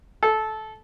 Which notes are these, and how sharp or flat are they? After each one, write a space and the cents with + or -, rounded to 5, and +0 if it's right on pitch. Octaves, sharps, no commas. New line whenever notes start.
A4 -15